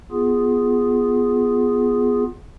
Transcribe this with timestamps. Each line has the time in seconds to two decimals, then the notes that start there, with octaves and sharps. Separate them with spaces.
0.12 B3 F4 G#4